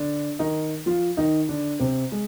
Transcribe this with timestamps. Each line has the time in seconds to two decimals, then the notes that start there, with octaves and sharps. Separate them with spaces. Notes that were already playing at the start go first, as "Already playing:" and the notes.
Already playing: D3 D4
0.39 D#3 D#4
0.86 F3 F4
1.17 D#3 D#4
1.48 D3 D4
1.80 C3 C4
2.12 G#3 G#4